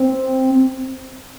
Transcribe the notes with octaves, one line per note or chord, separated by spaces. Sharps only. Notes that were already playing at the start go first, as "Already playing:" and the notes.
Already playing: C4